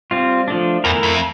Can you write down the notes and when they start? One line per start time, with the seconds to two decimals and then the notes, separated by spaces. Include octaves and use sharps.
0.11 G3 C4 F4
0.48 F3 A3 D4
0.84 E2 A3 E4 A#4
1.03 F2